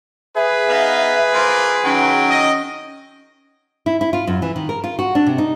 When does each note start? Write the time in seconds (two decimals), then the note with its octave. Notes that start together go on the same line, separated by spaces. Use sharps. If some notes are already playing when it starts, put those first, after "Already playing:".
0.36 G#4 B4 E5
0.69 B3 D#4 F5
1.33 A#3 F4 C5
1.85 D#3 F#3 C#4 G5
2.29 D#5
3.86 E4
4.01 E4
4.13 F4
4.27 F#2
4.42 E3
4.56 D#3
4.69 A#4
4.84 F4
4.99 F#4
5.15 D4
5.26 C3
5.38 D#4